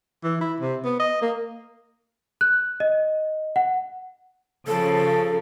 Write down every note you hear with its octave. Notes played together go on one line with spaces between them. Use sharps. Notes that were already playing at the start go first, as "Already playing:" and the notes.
E3
E4
C3
B3
D#5
A#3
F#6
D#5
F#5
C#3 F3 A4